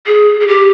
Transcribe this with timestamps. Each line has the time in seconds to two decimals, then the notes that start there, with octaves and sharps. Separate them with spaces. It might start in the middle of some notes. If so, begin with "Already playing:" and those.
0.07 G#4
0.40 G#4
0.48 G4